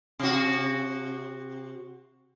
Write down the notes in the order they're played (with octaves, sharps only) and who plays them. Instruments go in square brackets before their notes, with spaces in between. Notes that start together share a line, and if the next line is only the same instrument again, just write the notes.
[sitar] C3 F#4